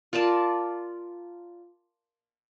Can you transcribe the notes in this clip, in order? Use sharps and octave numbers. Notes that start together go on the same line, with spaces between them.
F4 A#4 D5 A5